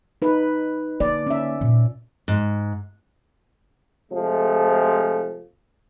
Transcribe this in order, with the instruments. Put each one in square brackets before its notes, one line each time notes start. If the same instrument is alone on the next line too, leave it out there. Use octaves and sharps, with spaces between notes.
[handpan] D#4 B4
[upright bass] D3 A#3 [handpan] D5
[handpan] C#4 E5
[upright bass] A#2 D#4
[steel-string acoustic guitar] G#2
[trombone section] C3 F3 G#3 A3